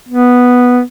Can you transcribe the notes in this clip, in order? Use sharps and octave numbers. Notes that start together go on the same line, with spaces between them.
B3